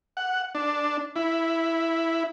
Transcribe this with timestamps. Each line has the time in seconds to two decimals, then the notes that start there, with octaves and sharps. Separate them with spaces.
0.17 F#5
0.55 D4
1.16 E4